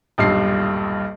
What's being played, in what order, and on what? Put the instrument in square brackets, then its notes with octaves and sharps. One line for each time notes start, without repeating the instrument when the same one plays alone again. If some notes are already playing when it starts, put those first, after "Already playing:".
[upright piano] D#1 B1 G2 C7